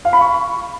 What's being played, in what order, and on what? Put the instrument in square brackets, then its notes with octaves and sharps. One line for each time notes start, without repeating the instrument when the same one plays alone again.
[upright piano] F5
B5
C#6